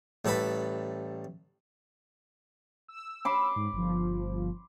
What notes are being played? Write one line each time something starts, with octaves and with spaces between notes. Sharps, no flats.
A1 G3 A4 B4 B5
E6
B5 C6 D6
G#2
G1 F3